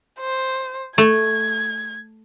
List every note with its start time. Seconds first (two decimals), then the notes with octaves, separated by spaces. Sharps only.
0.20 C5
0.98 A3 G#6